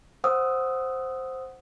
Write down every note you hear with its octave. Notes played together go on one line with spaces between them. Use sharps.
C5 F#5 D#6 E6